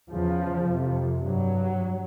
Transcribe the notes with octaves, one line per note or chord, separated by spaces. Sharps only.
E2 C#3 F3
F2 C3
G2 F#3